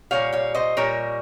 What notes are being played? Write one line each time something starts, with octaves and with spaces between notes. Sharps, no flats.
A#2 G3 C#5 F5
C#5 F5
C5 D#5
A#2 G3 A#4 C#5